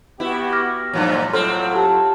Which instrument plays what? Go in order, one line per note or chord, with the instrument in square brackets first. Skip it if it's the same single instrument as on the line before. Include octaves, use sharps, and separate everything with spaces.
[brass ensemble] B3 F#4 G4 [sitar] E4
[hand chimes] D6 F6 A#6
[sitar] G2 F3 F#3 [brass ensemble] A#2
[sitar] A2 C4 [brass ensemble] F#3 F4 [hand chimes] A4 C6 F6
[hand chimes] G4 A5